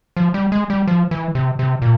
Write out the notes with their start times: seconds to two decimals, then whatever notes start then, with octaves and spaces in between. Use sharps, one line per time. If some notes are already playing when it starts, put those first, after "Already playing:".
0.17 F3
0.34 G3
0.52 G#3
0.70 G3
0.87 F3
1.11 E3
1.35 C3
1.59 C3
1.82 A#2